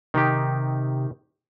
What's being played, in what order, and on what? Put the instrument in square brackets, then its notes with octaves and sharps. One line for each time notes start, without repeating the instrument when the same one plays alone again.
[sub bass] C3 [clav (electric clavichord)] D#3 D#4 G4